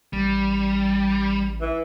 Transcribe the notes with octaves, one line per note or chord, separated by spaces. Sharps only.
A1 G3
E3